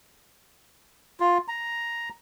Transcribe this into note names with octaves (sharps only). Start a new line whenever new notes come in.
F4
A#5